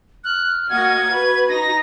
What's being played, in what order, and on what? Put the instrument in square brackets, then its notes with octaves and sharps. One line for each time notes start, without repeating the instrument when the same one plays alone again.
[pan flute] F6 [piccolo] F#6
[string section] A#3 F#4 D#5 [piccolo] G#6
[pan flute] F#4 [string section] B4
[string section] D#4 [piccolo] A#6